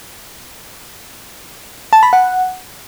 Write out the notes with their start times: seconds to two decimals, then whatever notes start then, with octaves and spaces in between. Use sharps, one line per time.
1.93 A5
2.03 B5
2.13 F#5